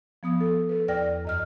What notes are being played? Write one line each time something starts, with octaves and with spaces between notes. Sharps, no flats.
F3 B3 D#6
A4
A4 B4
E2 D5 G5 F6 A#6
F#2 D#5 F6